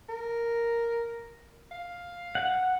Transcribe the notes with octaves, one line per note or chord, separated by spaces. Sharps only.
A#4
F5
F#5